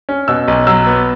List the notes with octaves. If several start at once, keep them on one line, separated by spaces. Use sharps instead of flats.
C#4
B2 E6
B1
F#3 E6
B3